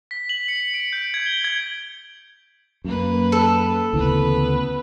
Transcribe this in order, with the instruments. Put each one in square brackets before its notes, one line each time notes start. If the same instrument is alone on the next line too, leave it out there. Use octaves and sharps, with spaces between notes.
[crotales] B6
F#7
C#7
D7
G6
G#6
G7
G#6
[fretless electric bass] F#2 [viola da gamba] A#3 B4
[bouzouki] A4
[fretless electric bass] D2 C#3 E3 [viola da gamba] B3 B4